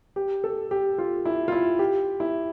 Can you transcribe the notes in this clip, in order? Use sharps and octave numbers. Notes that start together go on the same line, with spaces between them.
G4
A4
G4
F4
E4
F4
E4
G4
E4